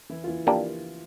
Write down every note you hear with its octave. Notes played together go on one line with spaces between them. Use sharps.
E3 E4
F4
E3 E4
F3 A#3 D4 F4 G4 D5